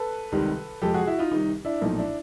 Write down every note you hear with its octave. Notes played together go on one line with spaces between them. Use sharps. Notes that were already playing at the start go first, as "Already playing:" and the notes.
Already playing: A4 B4
C#2 C3 D#3 G3
F2 C3 F3 G#3 G4 A4
F#4 G#4
E4 F#4
D#4 F4
C2 C3 D#3 D#4
D4 E4
B1 A#2 F3 A3 D#4
D4 E4